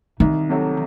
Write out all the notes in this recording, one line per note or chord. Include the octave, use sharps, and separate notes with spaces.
C2 D#3
C3 F#3 A3